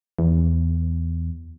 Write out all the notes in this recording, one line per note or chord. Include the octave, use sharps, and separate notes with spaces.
E2